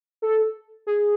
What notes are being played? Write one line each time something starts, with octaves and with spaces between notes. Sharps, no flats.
A4
G#4